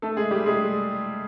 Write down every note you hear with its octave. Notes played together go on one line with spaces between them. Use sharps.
A3 A4
G#3 G#4
G3 G4
G#3 G#4